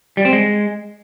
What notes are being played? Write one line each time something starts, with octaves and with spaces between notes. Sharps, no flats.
G3
C4
G#3